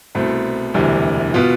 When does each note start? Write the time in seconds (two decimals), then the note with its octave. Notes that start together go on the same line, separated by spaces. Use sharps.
0.15 C2 B2 A3 C4
0.74 E1 D2 C3 E3 G3
1.34 B2 B3 F4